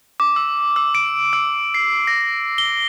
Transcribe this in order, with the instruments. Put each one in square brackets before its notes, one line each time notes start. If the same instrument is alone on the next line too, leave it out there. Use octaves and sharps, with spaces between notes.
[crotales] D6
E6
E6
D7
E6
C7
A#6
G7